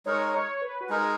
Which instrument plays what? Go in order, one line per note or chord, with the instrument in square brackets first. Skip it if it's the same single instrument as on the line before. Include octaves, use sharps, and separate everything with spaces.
[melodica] G#3 D#4 A#4 [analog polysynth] C#5
[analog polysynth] C#5
B4
F#4
[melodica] G#3 D#4 A#4 [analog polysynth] G#4